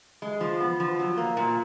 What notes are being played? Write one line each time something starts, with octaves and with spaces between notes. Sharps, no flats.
G#3
F3
B3
F3
F#3
A#3
A#2